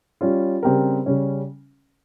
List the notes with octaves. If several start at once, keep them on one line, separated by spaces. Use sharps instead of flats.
G3 C#4 F4
C#3 G3 C4 G4 A#4
C#3 G3 C#4